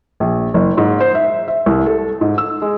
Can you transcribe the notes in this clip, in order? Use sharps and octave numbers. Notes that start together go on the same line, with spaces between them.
A#1
F#1
G#2
C5
E5
E5
C2
A4
G#2
E6
G#3